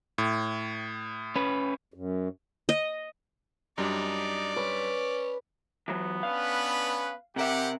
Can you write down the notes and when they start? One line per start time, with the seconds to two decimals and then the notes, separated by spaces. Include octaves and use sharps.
0.18 A2
1.36 C#4 B4
1.94 F#2
2.69 D#5
3.78 F#2 G3 D4 D#4 D5
4.56 C#4 B4
5.88 E3 F#3 B3
6.23 C#4 D4 B4 F5
7.36 C3 G4 A#4 E5 F#5